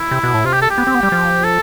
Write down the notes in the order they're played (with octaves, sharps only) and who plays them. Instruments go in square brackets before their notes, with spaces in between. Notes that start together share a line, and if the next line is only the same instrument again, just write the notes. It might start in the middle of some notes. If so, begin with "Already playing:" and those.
Already playing: [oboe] E4
[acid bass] C3
B2
A2
[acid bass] C3 [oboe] F4
[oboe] G4
A4
G4
[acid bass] B3
C4
B3
G3
F3
[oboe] A4